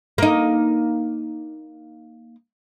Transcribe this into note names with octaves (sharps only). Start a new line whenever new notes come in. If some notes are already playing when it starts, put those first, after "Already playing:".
A#3 D#4